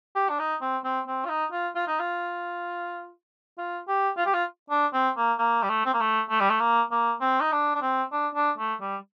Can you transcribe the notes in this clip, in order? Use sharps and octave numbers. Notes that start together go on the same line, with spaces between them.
G4
D4
D#4
C4
C4
C4
F4
D#4
F4
F4
D#4
F4
F4
G4
F4
G4
F4
D4
C4
A#3
A#3
G3
A3
C4
A#3
A3
A3
G3
A3
A#3
A#3
C4
D#4
D4
D4
C4
D4
D4
A3
G3